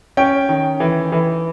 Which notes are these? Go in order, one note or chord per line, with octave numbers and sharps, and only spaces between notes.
C#4 G5
D#3
E3
E3